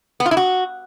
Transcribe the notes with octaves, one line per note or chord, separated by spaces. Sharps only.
B3
F4
E4
F#4